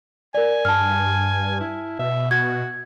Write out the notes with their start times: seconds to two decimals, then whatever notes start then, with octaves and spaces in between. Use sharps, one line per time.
0.35 A#4 D5 G#5
0.65 G2 A5 F6
1.60 E4
1.99 B2 E5
2.31 F#4 G#6